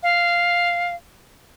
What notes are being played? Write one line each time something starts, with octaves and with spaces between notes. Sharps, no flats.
F5